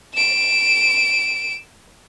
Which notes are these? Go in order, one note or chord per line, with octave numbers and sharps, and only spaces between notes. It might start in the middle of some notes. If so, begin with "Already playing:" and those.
D7 E7